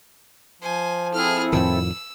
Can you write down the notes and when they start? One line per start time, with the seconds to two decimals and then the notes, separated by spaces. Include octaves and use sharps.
0.62 F3 C5 G#5
1.14 C4 E4 G#4 A4 F6
1.53 F2 A2 D#3 E6